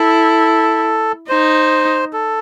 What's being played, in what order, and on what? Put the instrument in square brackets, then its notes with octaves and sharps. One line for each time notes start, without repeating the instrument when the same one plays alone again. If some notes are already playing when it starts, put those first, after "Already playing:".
Already playing: [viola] E4 [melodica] A4
[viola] D#4 [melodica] C5
[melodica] A4